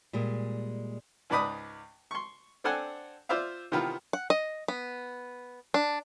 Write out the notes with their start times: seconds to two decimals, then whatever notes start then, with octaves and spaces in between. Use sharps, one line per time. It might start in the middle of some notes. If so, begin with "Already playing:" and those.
0.13 A#2 G3 G#3
1.30 C#2 G#2 B4 D5 B5 D#6
2.11 C6 C#6
2.64 C4 D4 A4 F#5 G#5
3.29 F4 C5 D5 E5 F5
3.72 C3 D#3 E3 B3 F4 B4
4.13 F#5
4.30 D#5
4.68 B3
5.74 D4